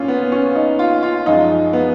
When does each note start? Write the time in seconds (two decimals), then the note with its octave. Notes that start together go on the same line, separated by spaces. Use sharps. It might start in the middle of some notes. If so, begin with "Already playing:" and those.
Already playing: A#2 A#3 C#4 F4
0.08 B3
0.32 C#4
0.56 D#4
0.79 F4
1.03 F4
1.26 F#2 F3 G#3 D#4
1.73 B3